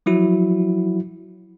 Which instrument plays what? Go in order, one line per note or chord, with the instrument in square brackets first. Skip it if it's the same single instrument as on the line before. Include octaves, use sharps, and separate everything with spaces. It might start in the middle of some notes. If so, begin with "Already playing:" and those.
[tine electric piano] F3 F#3 E4 F#4